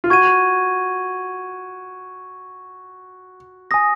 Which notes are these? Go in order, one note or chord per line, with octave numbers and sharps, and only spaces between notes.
F4
F#4 C#6 G#6 D#7
G#5 D#6 A#6